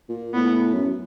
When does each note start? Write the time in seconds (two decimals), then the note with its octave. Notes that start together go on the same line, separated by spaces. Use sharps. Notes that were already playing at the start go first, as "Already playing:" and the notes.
0.09 A#2
0.34 A2 B3
0.74 F#2